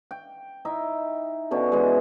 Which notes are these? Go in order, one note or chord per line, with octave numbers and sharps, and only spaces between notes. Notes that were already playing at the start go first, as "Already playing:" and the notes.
G5
D#4 E4 E5
B2 D3 B3 C#4
E3 G#3